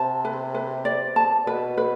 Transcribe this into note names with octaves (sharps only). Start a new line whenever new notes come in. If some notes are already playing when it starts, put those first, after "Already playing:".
Already playing: C3 A5
B4
B4
D5
A5
B2 B4
B4